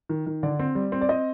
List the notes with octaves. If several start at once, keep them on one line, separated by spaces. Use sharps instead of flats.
D#3
D#3
D3 D5
C4
G3
C4
D5
C4 D#5